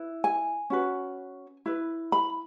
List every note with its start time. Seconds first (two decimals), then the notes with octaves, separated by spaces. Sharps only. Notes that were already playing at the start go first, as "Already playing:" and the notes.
Already playing: E4 B4
0.24 G#5
0.70 C#4 F#4 B4
1.66 E4 B4
2.12 B5